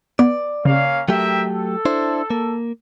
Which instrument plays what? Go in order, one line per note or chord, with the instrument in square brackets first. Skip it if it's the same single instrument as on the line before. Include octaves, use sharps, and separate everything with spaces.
[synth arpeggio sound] B3 [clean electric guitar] D5
[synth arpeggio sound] C#3 [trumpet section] A#3 C#4 F5
[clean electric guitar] F#3 A3 G4 [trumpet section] A#4 E5 G5
[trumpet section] A4
[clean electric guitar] D4 E4 C5
A#3